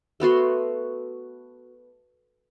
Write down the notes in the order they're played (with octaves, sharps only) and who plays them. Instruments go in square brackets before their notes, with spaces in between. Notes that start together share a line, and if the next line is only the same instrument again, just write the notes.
[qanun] A3 B3 F#4 C6